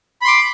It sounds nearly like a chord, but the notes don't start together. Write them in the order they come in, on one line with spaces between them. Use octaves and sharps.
B5 C6 D6